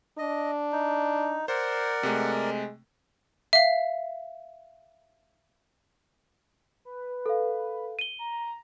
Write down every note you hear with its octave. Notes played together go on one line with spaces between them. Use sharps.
D4 D#5
D#4
A#4 C5 D5 F#5
C3 G#3 A3
E5 F5
B4
A4 F5
D#7 G7
A#5